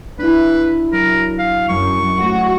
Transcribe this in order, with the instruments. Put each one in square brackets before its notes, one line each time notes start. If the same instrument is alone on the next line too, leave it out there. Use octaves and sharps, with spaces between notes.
[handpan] D4 E4 [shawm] B4
[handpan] F#3 [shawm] A#4
[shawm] F5
[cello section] F#2 [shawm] C#6
[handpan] F#3 A3 [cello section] F#4